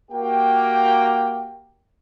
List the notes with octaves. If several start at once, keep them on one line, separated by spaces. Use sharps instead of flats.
A#3 F#4 G4 G5